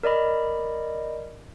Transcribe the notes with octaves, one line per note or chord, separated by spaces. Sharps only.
A#4 D5 D#5 B5